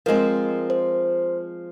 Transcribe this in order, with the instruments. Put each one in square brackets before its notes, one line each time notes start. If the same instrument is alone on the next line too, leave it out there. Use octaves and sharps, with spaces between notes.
[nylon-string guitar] F3 G#3 C4 [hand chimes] A#4
[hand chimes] C5